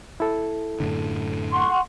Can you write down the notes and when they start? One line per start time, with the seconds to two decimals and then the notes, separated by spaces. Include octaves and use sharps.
0.20 E4 A4
0.80 F#2 A2 D3
1.51 F#5 C6 C#6